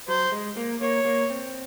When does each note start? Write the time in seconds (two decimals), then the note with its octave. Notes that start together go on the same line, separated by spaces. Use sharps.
0.08 F#3 C5
0.32 G#3
0.57 A#3
0.81 A#3 C#5
1.05 A#3
1.30 C4